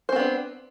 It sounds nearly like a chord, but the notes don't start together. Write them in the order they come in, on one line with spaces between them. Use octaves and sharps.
C5 C4 B3 D4